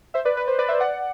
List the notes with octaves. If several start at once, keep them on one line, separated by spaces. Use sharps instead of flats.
C5 E5
B4 D5
B4
C5
B4 D5
C5 E5
D5 F#5